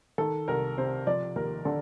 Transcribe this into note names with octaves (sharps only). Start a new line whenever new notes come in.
D#3 A4
C2 A#4
C3 C5
F3 D5
D#2 A#4
D3 A4